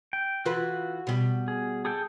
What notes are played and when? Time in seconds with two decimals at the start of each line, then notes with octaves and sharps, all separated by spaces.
0.13 G5
0.45 E3 F4 F#4 B4
1.07 B2 G3
1.48 G#4
1.85 G#4 A4 G5